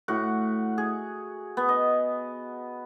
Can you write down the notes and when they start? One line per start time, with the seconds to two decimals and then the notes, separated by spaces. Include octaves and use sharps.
0.08 A2 F#4 F#5
0.78 G#4
1.57 B3
1.69 D#5